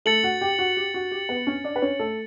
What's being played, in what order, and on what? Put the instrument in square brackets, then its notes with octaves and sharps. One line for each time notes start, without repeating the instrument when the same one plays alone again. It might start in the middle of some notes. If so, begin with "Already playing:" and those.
[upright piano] A3 A4 [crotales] A6 C#7 F#7
[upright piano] F#4 F#5
G4 G5
F#4 F#5
G4
F#4
G4
B3 B4
C#4 C#5
D4 D5
B4
C#4 C#5
A3 A4